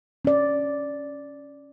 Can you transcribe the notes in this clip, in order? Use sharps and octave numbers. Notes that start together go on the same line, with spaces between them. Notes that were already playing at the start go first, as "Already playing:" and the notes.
C#4 D5